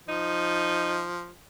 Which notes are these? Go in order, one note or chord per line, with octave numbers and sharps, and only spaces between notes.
F3 D#4